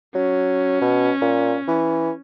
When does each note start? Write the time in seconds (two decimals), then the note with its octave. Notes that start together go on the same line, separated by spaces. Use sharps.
0.15 F#3 C#4
0.81 B2
1.21 A#2
1.68 E3